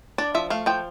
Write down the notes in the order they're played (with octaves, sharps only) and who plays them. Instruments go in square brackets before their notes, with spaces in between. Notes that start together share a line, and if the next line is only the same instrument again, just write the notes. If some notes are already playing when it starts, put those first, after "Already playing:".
[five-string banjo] D4 D5
F3 E5
A3 F5
F3 G5